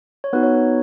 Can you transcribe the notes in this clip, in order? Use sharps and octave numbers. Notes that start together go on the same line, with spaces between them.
C#5
B3 D#4 F#4 B4
C#5
B4